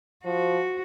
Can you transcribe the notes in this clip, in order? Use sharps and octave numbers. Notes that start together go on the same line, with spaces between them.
F3 F#4